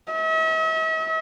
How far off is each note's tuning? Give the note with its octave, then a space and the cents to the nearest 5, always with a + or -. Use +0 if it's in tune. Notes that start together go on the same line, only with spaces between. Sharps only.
E5 -45